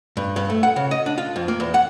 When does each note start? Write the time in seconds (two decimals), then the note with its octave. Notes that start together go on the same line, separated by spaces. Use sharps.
0.17 G2
0.36 G2
0.50 A3
0.63 F#5
0.76 C#3
0.91 D#5
1.06 D4
1.18 F4
1.36 F2
1.48 A#3
1.60 E2
1.74 F#5